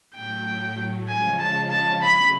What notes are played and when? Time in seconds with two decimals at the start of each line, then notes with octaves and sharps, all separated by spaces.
0.15 A2 F#3 A3 G5
1.08 C#3 F3 G#3 C#4 F4 G#5
1.39 A5
1.71 A5
2.01 C#3 F#3 A3 C#4 B5